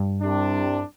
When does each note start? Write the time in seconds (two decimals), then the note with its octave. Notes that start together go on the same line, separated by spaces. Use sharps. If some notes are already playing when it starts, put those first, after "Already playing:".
Already playing: G2
0.21 C2 C3 G3 D4